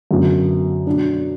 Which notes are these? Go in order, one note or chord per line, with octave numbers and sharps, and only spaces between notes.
F#2 D3 F#3 B3
B2 F#3 D4